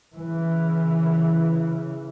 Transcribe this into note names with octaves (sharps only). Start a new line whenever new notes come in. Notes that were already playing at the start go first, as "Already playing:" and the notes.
C#3 E3